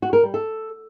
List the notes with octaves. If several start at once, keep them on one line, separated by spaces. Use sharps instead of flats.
F#4
A#4
G3
A4